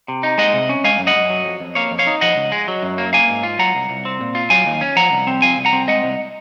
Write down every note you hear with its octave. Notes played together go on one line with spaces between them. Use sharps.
C3
D#4
G#3 D#5 F#5
C3
C#4
G#3 F5 G#5
F#2
D#5 F#5
F#2
F#3
F2
F2
A#3 C#5 F5
F2
C#5 F5
D#4
F3 D#5 F#5
C#2
G#3
F#3
F#2
A#3
A#3 F5 G#5
G#2
F4
F#3 F#5 A#5
C2
C2
C4
A#2
F4
F#3 F5 G#5
D#2
C#4
F3 F#5 A#5
C2
C4
F3 F5 G#5
C2
F#5 A#5
C4
G#3 D#5 F#5
C2